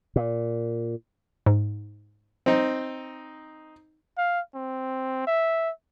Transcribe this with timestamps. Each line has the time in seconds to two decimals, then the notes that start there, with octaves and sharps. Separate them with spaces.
0.16 A#2
1.46 G#2
2.46 C4 D#4
4.18 F5
4.55 C4
5.27 E5